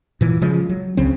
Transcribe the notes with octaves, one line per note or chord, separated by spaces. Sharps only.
A#2 E3
C#3 F3 G#3
F#3
C#2 C#3 C4